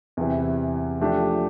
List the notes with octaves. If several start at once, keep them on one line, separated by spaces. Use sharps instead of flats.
E2 C3 E3
F3 A3 D4 G4